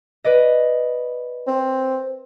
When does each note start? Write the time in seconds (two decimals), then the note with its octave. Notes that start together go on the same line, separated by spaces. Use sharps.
0.24 B4 D5 D#5
1.47 C4